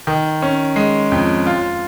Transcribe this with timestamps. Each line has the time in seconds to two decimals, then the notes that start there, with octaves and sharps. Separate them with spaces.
0.07 D#3
0.42 C#4
0.76 G#3
1.12 F2
1.47 F4